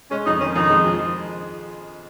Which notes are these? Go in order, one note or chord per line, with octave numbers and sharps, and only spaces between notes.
G#3 C#4
F2 D#4
D#3 C#4
F2 D#4
G#3
F3